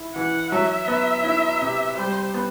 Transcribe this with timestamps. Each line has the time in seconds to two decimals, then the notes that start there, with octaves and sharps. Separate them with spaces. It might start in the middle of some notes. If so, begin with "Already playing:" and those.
Already playing: E4
0.15 E3 F#5
0.52 F#3 E5
0.88 B3
1.24 E4
1.61 C3
1.97 G3 C5
2.34 B3